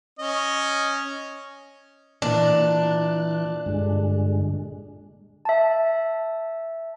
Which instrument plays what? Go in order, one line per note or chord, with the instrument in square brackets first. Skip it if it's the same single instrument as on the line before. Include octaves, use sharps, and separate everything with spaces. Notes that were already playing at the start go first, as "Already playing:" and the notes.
[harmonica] C#4 D#5
[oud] A#2 [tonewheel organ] E3 F#6 [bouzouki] D4
[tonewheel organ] G2 D3 G#3
[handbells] E5 A5